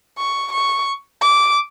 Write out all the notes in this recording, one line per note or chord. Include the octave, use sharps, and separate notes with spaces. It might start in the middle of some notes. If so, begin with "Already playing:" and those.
C#6
C#6
D6